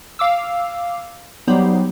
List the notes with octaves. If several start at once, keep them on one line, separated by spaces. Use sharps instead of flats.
F5 D6 E6
F#3 G3 B3 D#4 G4 C5